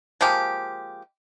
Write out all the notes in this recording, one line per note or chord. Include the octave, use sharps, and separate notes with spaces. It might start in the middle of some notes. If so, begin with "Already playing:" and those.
F3 G#3 A#3 G4